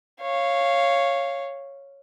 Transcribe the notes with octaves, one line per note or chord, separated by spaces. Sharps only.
C#5 F5